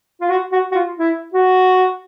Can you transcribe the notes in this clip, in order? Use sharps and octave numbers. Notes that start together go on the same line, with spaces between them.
F4
F#4
F#4
F#4
F4
E4
F#4